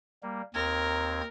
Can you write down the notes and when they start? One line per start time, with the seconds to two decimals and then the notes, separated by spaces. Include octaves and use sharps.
0.23 G3 A#3
0.54 D#2 C4 A#4 G#6